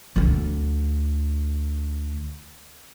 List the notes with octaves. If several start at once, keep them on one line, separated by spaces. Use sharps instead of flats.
D2 D3